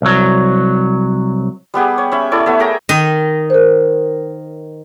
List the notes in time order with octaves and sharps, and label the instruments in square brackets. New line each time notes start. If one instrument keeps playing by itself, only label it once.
[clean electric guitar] C2 F#3
[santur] G3 B3 G4 G#4
C#5
C#4 E5 B5
E4 A4 C#5 D5
A3 B3 E5
G#4 A#4 G5 A#5
[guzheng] D#3 D#5
[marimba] A#4 C5